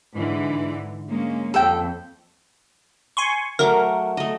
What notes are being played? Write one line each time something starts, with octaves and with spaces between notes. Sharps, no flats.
G#2 D3 E3
G#3 A#3 C#4
F2 A4 G5
G#5 C6 C#6
F#3 A3 A#4 D6
A3 D#5